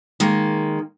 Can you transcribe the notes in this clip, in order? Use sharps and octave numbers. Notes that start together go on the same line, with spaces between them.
D#3 G#3 A#3